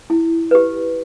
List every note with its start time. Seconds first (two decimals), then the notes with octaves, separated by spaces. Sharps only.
0.10 E4
0.51 G4 B4